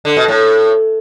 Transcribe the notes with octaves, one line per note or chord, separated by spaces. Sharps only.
D3
B2
A2